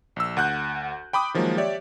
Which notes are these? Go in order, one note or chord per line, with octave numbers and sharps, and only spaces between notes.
A#1 E6
D2 F#5 F#6 G6
G5 B5 D6 D#6
D#3 F3 F#3 G#3 A#3
G4 C#5 D5 E5